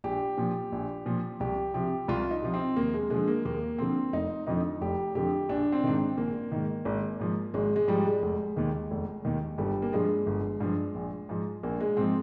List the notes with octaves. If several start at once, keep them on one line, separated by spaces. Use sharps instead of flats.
A#1 G4
A#2 F3
A#1
A#2 F3
C2 G4
C3 F3 G4
C2 F4
D#4
C3 F3
C4
D#2 A#3
G#3
D3 F3 G#3
A#3
D#2 A#3
D3 F3 C4
F1 D#4
F2 D3 F3 D#4
F1 G4
F2 D3 F3 G4
A#1 D4
C4
G#2 D#3 D4
C4
A#1 A#3
G#2 D#3
G#1
G#2 F3
G#1 G#3
G#3
G#2 F3 G3
G#3
F1
D#2 D#3
F1
D#2 D#3
G1 G3
A#3
G2 F3 G#3
G1
G2 F3
A#1
G#2 F3
A#1 A#3
G#3
G#2 F3 C4